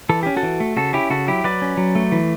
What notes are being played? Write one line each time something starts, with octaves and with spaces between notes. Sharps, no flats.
E3 A4
C#4 G4
F#4 A4
E3
A3
C#3 F#4 A4
C#4 E4 G4
C#3 F#4 A4
F#3 E4 G4
F#3 B4 D5
C#4
F#3
A3
E3